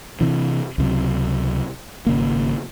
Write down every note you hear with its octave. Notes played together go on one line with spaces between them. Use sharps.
C3 E3
C#2 C3 F#3
G#1 C#3 A#3